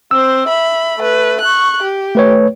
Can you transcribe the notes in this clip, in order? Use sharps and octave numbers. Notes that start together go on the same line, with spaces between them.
C4 C5 E6
E5 B5
A3 B4
C#6 F#6
G4
A3 B4 C#5